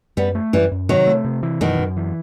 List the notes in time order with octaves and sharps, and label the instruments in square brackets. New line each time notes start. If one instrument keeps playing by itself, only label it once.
[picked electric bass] F#2 [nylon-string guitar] G3 B3
[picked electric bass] A3
[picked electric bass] F#2 [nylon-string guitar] E3 G3
[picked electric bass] F#2
[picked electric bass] C3 [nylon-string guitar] D#3 F#3
[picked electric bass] A3
C3
E3
[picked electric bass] F#2 [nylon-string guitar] B2 D#3
[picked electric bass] F#2
E3